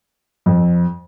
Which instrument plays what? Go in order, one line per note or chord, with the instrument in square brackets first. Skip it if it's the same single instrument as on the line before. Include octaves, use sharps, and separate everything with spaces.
[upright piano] F2